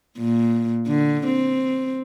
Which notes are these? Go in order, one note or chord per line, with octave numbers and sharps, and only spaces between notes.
A#2
D3
C4